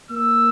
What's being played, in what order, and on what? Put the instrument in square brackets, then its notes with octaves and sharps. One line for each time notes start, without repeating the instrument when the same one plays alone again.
[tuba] A#3 [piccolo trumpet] E6